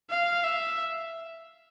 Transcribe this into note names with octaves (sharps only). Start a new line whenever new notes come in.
F5
E5